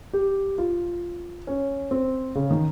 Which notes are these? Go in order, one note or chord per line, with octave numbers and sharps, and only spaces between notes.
G4
F4
C#4
C4
C#3
D#3